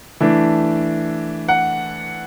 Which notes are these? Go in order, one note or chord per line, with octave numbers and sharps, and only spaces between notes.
E3 A3 D4
F#5